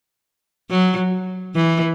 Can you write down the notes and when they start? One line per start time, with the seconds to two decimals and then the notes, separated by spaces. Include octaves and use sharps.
0.70 F#3
1.55 E3